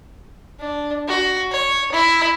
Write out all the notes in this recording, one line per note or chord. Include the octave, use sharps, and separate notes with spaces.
D4
F#4
C#5
E4